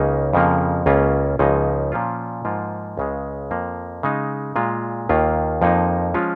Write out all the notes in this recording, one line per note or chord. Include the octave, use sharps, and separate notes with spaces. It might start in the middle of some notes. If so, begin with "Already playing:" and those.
Already playing: C#2 C#3 A#3 D#4
F2 C#3 F3 A#3
C#2 C#3 A#3 C#4 F4
C#2 C#3 F3 A#3 D#4
A#2 F3 C#4 F4
G#2 F3 A#3 F4
C#2 C#3 G#3
F2 F3 A#3
C#3 G#3 D#4
A#2 G#3 F4
D#2 D#3 A#3 F4
F2 F3 A#3 D#4
F3 G#3 C#4 F4